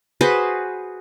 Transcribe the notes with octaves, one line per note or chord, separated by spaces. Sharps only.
F#4 G#4 B4 C5